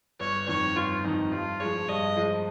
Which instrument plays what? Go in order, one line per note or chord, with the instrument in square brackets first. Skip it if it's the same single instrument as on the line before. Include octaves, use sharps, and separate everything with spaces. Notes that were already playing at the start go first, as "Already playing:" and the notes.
[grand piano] G1 [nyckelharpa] C#5
[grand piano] F2 D#3 [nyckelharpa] C#5
[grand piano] G1 [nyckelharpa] F4
[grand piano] F2 D#3 [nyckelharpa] D#4
[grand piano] G2 [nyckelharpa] F4
[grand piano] F3 G#3 [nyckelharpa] C#5
[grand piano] G2 [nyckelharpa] D#5
[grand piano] F3 G#3